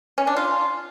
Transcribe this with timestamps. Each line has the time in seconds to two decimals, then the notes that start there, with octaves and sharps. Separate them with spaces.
0.18 C#4
0.27 D4
0.37 F4